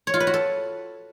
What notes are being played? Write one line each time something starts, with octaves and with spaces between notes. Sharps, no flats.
C#5
F4
B4
F#4
A4